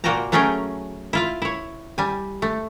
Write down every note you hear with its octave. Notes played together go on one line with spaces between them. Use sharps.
A#2 A#3 F#4 G5 A5 A#5
F#3 A3 C#4 G#4 A#4 G5
E4 F4 F5
E4 C#5
G3 G#5
A3